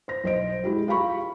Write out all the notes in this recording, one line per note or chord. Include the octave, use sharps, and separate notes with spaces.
C5 A#6
B1 C5 D#5 D7
G#3 E4 F#4 G4
F4 G4 F5 B5 C#6